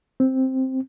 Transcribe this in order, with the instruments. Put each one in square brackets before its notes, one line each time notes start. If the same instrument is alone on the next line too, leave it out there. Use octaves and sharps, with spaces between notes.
[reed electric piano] C4